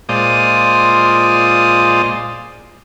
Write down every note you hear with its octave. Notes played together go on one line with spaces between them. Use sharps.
A#2 G#3 F4 C5 D5 D#6